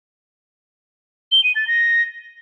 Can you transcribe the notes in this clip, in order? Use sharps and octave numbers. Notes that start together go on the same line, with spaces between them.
G7
D#7
A6
A#6